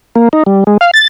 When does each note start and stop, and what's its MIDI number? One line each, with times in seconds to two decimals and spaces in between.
0.16 0.29 58
0.33 0.43 63
0.46 0.64 55
0.67 0.77 56
0.81 0.91 77
0.94 1.08 93